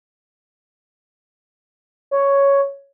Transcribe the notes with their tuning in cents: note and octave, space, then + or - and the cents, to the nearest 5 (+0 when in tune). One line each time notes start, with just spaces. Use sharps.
C#5 +5